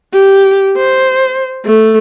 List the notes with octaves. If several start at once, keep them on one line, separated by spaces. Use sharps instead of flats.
G4
C5
A3